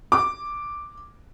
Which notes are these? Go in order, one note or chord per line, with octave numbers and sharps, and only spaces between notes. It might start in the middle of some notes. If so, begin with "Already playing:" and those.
D6